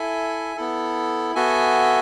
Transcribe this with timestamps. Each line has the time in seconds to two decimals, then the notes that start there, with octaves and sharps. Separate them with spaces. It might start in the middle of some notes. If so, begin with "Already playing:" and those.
Already playing: E4 A4 E5 G#5
0.56 B3 E4 A4
1.35 B3 F#4 A4 E5 G#5